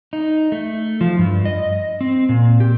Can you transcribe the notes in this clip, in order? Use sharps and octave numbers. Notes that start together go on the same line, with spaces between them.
D#4
A3
F3
G2
D#5
C4
A#2
G4